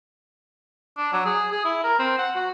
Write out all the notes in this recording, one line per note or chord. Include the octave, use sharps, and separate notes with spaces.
D4
F#3
G#4
G#4
E4
A#4
C4
F#5
F#4